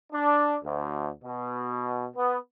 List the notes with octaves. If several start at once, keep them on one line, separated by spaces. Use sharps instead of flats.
D4
D2
B2
B3